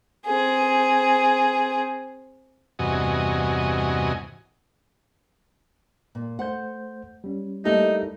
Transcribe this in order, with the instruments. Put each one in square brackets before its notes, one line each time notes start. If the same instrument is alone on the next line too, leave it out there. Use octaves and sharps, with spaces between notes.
[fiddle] C4 G#4
[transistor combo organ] E2 G2 C3 F#4 D#5 G#5
[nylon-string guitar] A#2
[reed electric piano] A3 C5 G6 [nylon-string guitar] F#5
[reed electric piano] G3 C#4
[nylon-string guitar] G3 A3 A#3 [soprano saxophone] D#4 [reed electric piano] E4 G4 A4